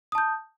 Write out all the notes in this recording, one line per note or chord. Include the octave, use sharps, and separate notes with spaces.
A5 D#6 G6